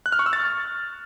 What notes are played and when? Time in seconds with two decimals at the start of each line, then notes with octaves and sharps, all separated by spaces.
0.06 F#6
0.12 F6
0.19 C#6
0.26 E6
0.33 A6